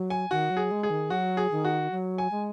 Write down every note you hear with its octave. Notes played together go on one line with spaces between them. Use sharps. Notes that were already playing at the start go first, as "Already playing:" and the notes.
Already playing: F#3
G#5
D#3 F#4
F#3
G#4
G#3
G#4
D#3
F#3 F#4
G#4
D#3
F#4
F#3
G#5
G#3